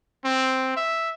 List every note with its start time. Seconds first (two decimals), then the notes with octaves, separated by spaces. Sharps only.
0.25 C4
0.77 E5